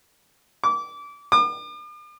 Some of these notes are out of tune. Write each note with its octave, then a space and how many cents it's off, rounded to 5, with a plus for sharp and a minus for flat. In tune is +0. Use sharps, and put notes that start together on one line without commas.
D6 -25
D6 +45